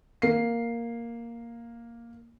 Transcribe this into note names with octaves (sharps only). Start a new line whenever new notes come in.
A#3 C7